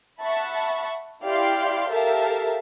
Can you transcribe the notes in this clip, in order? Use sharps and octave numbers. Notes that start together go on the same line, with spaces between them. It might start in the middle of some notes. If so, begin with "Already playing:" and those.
E5 F#5 A5 B5 C#6
E4 G4 D5 F5 G5 C6
G4 A4 A#4 E5 F5 A5